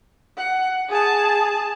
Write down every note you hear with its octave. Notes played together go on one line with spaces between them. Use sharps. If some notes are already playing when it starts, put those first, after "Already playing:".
F#5
G#4 A5